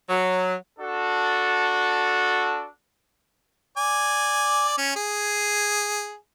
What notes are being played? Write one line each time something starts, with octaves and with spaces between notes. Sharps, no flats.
F#3
D4 F#4 A4
D5 G#5
C#4
G#4